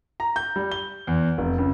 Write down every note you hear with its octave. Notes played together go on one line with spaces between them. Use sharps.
A#5
G6
G3
G7
E2
F1
C#2